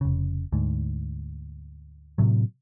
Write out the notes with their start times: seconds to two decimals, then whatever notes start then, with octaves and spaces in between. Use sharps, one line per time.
0.01 F1 C#3
0.52 D2 G#2
2.18 A2 C3 F#3